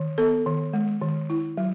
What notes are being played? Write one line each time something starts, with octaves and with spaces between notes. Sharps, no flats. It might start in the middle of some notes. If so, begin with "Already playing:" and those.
Already playing: D#3
B3 A4
D#3
G#3
D#3
E4
F#3